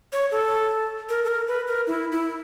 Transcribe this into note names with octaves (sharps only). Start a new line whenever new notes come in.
C#5
A4
A#4
A4
A#4
B4
A#4
E4
E4